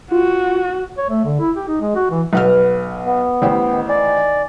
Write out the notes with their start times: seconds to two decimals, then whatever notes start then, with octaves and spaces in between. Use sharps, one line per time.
0.12 F4 F#4
0.98 C#5
1.10 A3
1.25 D3
1.40 E4
1.56 G4
1.68 D#4
1.81 G#3
1.95 F#4
2.11 E3
2.33 B1 B4 F#5 F6
3.06 B3
3.42 A1 G4 C5
3.73 D#3
3.89 D5 G#5